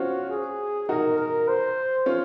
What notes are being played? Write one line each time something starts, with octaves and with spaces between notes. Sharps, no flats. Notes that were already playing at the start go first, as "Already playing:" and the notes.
Already playing: C4 C#4 F4 F#4
G#4
D#4 F#4 A#4
A#4
C5
C#4 F4